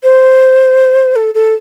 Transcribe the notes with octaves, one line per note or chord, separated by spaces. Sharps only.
C5
A4
A4